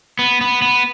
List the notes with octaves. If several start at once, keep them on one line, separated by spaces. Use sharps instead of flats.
B3
B3
B3